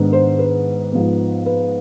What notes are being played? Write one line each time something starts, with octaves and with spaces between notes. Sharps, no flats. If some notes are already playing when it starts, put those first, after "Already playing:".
Already playing: G#2 D#3 B3 D4
C5
B4
G#2 F3 B3
B4